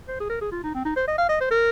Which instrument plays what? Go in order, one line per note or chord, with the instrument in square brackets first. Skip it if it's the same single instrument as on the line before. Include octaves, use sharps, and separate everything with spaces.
[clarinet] C5
G#4
A#4
G#4
F4
D#4
C4
D#4
C5
D#5
F5
D#5
C5
A#4